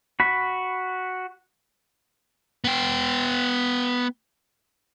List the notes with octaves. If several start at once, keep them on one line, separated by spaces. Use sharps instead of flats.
F#4 B5
B3 G5